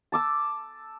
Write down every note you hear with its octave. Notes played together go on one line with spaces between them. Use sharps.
A5 D6 E6